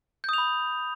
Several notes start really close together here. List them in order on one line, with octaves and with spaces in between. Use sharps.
G6 D#6 F7 B5